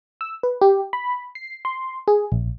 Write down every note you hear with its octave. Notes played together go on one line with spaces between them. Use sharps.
E6
B4
G4
B5
C7
C6
G#4
A#1